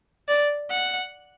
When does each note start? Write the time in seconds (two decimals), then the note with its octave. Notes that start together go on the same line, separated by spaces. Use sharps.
0.28 D5
0.70 F#5